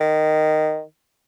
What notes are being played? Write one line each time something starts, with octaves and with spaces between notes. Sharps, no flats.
D#3